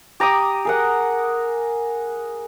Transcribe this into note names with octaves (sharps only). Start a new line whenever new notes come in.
G4 A#5 D6 D#6
G#4 A#4 F#5